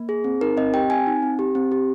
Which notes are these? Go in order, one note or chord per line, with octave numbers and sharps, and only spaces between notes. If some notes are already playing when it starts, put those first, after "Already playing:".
Already playing: A#3
G#4
C4
D#4 A#4
C4 D#5
G4 G5
C4 G#5
D#4
C4
G4
C4
G4